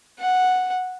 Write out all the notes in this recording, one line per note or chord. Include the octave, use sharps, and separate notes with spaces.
F#5